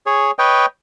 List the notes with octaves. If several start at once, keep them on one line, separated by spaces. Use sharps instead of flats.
G#4 C#5
B4 C#5 D#5 G5